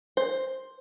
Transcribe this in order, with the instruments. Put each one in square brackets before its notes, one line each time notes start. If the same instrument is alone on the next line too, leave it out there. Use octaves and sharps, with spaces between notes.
[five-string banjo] C5